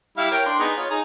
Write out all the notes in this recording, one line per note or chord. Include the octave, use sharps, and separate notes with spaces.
G3 E4 F5
A#4 C#5 G5
D4 C6
B3 D#4 G#4
F4 C#5
D#4 G#4 A#5